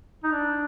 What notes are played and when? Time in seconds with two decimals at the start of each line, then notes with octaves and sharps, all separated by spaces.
0.24 D#4
0.32 D4